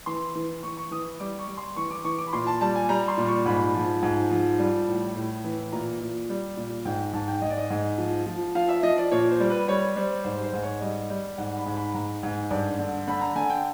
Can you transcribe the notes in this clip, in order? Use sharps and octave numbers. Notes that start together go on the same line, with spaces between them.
E3 C6
E3
E3 C#6
C#6
E3 D#6
G3 D6
C#6
G3
C6
E3 C#6
D6
E3 C#6
D6
B5
A#2 C6
A5
G3 A5
G#5
G3 A#5
C6
A#2
C#6
G#2 B5
F3
G#2
F3
G3
A2
A2
E3
A#2 A#5
A#2
G3
A#2
G#2 G5
G#2 A5
G5
G#2 D#5
D5
D#5
G#2
F3
F3
F3 F5
E5
F3 D#5
D5
A#2 C#5
C5
G3
B4
G3 C#5
G3 C5
G#2 C5
C5
G#2
C#5
G3 D#5
G3
G#2 F#5
B5
G#2
B5
G#2 A#5
G#2
G2
D3
D3 B5
A#5
D3 G#5
G5